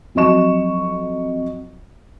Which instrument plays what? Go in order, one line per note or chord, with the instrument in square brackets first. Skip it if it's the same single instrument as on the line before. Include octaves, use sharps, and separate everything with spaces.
[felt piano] F2 F#3 F#4 D#5 C#6 E7